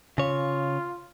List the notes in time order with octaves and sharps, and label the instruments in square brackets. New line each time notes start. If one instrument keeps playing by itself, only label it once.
[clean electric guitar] C#3 C#5 [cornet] F4